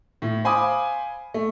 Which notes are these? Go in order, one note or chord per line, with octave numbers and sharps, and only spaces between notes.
A2
C5 F5 G#5 B5 D6 D#6
A3